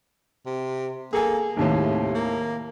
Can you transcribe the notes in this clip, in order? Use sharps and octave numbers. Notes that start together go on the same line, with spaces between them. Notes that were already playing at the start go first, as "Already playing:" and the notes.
C3
A#3 G#4 A4 G#5
G#1 D#2 A2 C3
A#3